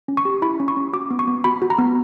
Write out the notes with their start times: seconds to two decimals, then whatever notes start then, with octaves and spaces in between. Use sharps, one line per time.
0.08 C#4
0.17 C#6
0.25 G4
0.42 E4 B5
0.60 C#4
0.68 C#6
0.77 C#4
0.93 F#4 D6
1.11 B3
1.19 C#6
1.28 B3
1.44 F#4 B5
1.62 F#4
1.70 A#5
1.78 B3